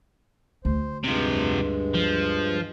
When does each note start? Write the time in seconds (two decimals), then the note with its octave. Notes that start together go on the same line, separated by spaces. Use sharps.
0.65 D2 C5
1.04 G2 C3 F3 G#3
1.95 F3